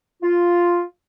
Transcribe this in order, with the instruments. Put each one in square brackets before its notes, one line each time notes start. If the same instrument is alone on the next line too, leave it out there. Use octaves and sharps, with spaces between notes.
[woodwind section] F4